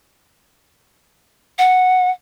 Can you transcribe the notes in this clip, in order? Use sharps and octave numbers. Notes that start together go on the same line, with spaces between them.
F#5